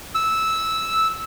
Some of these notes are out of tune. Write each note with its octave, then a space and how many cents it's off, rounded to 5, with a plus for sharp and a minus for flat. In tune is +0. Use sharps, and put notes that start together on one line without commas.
E6 -10